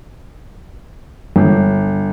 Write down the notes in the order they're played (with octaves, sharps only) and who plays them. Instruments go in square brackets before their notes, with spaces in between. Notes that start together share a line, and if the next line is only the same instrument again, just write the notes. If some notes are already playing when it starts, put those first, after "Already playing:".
[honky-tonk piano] G1